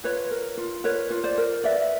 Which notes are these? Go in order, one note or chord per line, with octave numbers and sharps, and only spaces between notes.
F4 B4 C#5
A#4
F4
A#4 B4 C#5
F4
C5 D5
A#4
B4 D5 E5